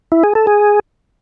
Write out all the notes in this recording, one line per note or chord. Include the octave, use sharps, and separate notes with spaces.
E4
G#4
A4
G#4